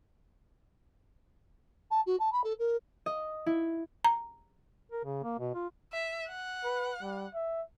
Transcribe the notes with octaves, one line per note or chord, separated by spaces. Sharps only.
A5
F#4
A5
B5
A4
A#4
D#5
E4
A#5
A#4
C#3
A#3
B2
F4
E5
F#5
B4
G3
E5